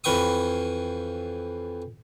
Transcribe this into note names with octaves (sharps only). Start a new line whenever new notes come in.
F2 E3 B4 G5 C#6 D#6